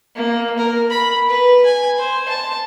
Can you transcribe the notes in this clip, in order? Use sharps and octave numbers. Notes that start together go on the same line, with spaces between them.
A#3
A#4
B5
B4
G#5
C5
A5